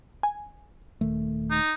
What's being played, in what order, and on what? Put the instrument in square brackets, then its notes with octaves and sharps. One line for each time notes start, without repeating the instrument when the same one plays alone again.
[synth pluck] G#5
[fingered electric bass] D#1 D#3 A3
[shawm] D#4